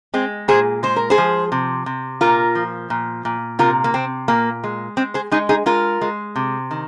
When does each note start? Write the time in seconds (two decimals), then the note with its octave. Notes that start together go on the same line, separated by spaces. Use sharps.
0.14 G#3 C4
0.48 A#2 G#4 C5
0.83 G#3 C5
0.96 A#4
1.10 G#4 C5
1.18 F3
1.52 C3
1.86 C3
2.21 A#2 F4 A#4
2.55 F3
2.90 A#2
3.25 A#2
3.59 C3 F4 A#4
3.84 A#3
3.94 C3 C4
4.28 A#2 A#3
4.64 G#3
4.97 G#3 C4
5.14 G#4 C5
5.31 G#3 D#4 G#4
5.49 D#4 G#4
5.66 G#3 F4 A#4
6.01 G#3
6.36 C3
6.71 D#3